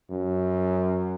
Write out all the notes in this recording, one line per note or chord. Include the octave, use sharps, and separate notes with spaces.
F#2